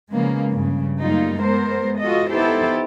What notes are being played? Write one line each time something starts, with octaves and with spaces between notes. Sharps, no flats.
C#3 F3 G#3 A#3 B3
G2 C#3
F#2 G3 A3 A#3 D#4 F4
G#3 B3 A#4 C5
F4 F#4 A4 D#5
B3 D#4 E4 G4 A4 C5